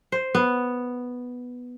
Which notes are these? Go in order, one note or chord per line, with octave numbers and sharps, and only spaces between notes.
C5
B3